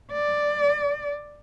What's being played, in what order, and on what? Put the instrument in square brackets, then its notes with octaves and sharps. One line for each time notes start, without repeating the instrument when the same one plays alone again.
[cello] D5